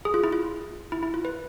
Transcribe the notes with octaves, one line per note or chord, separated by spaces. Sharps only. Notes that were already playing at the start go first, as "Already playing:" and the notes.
G#4
F4
E4
F4
E4
E4
F4
B4